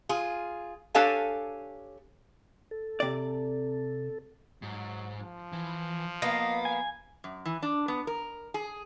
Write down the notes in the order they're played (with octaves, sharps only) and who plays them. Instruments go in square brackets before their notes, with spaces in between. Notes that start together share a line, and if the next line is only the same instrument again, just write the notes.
[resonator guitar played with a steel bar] F4 G#4
D4 G4 A4 C#5 F5 G#5
[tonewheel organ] A4
[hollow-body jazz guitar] C3 D5
[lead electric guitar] G#2 [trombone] F#3
[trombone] F3
[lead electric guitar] E3
[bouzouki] A#3 B3 [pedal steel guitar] D#5 [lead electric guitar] F5
[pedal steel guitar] G#5
[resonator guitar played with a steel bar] F#2
E3
D4
B3
A#4
G#4